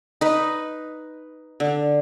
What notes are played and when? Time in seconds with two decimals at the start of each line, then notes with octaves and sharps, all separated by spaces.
0.21 D#4 B4
1.60 D3